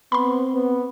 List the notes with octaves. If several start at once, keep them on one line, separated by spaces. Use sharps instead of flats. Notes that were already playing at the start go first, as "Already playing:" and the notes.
B3 C4 B5 C6
B3